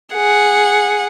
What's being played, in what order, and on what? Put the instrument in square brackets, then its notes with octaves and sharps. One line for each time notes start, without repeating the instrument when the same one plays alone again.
[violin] G#4 F#5